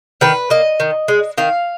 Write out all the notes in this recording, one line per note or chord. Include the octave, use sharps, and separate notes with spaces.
D#3 B4
A#3 D#5
D#3
G#3
D#3 F5